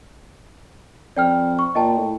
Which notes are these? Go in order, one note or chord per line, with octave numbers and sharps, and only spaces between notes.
F2 D5 G5 F6
C#6
A#2 D#5 G5 A5
A2